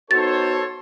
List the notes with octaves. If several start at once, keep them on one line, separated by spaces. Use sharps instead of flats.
B3 D#4 F#4 A4 C5 C#5 A6